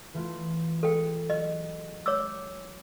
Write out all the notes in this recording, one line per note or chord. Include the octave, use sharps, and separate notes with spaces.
E3 A3 F4
G#3 A4 G5
F#3 D#5
C#5 D6 E6